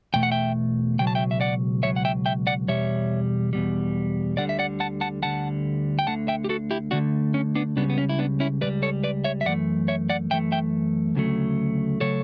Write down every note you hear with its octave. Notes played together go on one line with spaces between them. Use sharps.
E2 B2 A3 G5
F#5
E5 G5
C#2 B2 F#3 G5
A5
E5 G5
E5
D5 F#5
C#2 B2 F#3 C#5 E5
F#5
E5 G5
E5 G5
D5 F#5
E2 B2 G3 C#5 E5
E2 B2 G3
D2 D3 G3 D5 F#5
E5
D5 F#5
F#5 A5
F#5 A5
D2 D3 G3 F#5 A5
G5
D2 D3 A3 F#5 A5
E5 G5
G4
F#4 A4
E4 G4
D2 D3 A3 D4 F#4
C#4
B3 D4
C#2 C#3 G3 B3 D4
B3
C#4
E4
B3 D4
C#4 E4
C#2 C#3 G3 B4 D5
A4 C#5
B4 D5
C#5 E5
E5
F#2 E3 A3 D5 F#5
C#5 E5
D5 F#5
F#2 E3 A3 E5 G5
E5 G5
D2 C#3 F#3 A3
C#3 F#3 A3 A4 C#5